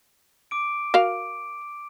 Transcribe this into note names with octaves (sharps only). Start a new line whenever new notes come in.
D6 D7
F#4 A#4 F5